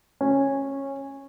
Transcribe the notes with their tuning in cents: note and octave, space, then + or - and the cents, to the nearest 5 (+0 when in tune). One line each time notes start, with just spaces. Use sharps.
C#4 -15